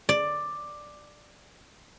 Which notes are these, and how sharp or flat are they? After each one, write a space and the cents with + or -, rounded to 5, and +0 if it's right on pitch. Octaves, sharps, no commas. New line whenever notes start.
D5 +10